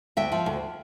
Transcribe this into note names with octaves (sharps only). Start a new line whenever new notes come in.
D2 E5 G5
F3
D2